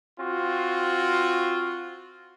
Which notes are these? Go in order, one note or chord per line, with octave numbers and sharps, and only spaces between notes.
C4 F4 F#4